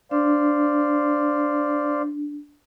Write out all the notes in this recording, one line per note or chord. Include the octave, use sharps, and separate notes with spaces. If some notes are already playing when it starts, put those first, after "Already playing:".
D4 C5 D5 F5